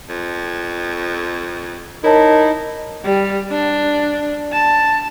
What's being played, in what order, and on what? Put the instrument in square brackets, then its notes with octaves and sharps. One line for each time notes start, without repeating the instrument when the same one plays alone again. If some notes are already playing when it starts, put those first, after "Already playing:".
[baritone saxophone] F2
[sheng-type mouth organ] D#4 [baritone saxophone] E4 [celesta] A#4 C#5 A5
[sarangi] G3
D4
A5